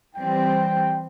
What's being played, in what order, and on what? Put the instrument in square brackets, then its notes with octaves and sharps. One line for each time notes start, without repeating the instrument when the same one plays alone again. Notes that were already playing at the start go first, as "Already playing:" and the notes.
[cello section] E3 G3 C4 [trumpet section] G5